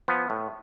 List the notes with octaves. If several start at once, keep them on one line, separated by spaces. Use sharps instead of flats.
F3 B3
A2